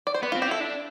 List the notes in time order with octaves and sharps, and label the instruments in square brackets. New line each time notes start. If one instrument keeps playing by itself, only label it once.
[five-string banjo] D5
C5
[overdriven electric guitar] B3 [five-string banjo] B4
[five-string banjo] F4
[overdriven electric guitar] C4
[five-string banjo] G4
[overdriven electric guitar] E4 [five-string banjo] A4
[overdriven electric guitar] D4